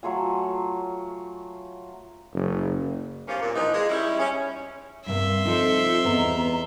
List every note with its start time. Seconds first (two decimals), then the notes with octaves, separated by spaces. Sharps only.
0.03 F#3 A3 F4 G#5
2.33 F#1
3.28 G2 C3 F3 A#3 C#4 F4
3.42 A#2
3.55 E3 F3 D4 D#4
3.74 G#3
3.89 G3 C#4 D#4 E4
4.19 C#4
5.06 G2 C3 A#3 E5 C6
5.45 F3 C4 D#4 F4 A4 C5
6.05 E2 B3 D5 D#5 A#5